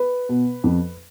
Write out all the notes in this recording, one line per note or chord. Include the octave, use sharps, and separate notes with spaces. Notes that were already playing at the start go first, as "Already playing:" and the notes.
Already playing: B4
B2
F2